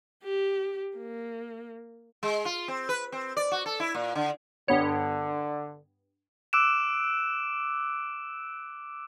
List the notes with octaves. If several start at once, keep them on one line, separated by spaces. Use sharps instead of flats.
G4
A#3
G#3
F4
C4
B4
C4
D5
F#4
A4
E4
A#2
D3
G2 D3 B3 C#5
D6 E6 F#6 D7 E7